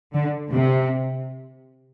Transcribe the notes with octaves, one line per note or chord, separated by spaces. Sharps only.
D3
C3